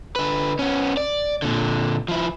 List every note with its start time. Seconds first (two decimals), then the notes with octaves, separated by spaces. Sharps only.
0.16 D3 B4
0.59 B3 C#4
0.97 D5
1.42 A#2 D3
2.08 F3 E4